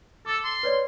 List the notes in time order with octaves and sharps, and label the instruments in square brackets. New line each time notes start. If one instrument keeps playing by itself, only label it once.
[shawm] A4 [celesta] D6 E6 A6
[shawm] C6
[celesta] B4 C#5 D5